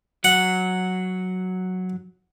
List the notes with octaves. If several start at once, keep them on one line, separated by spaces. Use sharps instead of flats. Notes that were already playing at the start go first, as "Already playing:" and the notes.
F#3 F#5